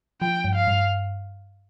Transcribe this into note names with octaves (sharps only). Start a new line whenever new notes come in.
F3 G5
G2
F5
G2